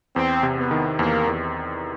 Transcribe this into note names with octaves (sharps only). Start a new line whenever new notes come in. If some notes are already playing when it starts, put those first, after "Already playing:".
E2 C4
C3
B3
D#3
E2 A#3
E2